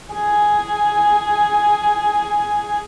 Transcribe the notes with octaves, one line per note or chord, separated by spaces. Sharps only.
G#4 G#5